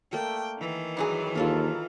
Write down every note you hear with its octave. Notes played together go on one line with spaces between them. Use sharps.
A3 A#3 D5 G5
D#3 E3
G2 F#3 G#4
D#2 F4 A4 A#4